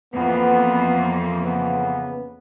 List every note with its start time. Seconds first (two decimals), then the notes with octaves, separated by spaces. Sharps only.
0.14 F2 E3 A#3 B3
1.41 C#3 B3